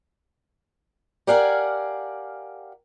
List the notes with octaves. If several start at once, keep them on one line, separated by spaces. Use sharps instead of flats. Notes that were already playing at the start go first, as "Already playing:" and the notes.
G4 A#4 D5 F5 F#5 G#5